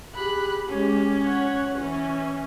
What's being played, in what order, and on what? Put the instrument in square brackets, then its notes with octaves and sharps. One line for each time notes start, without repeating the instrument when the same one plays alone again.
[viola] G4 G#4 [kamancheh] B5 F#6
[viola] G#3 G4 [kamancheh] C#4
[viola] C#5 F#5
E3 C#4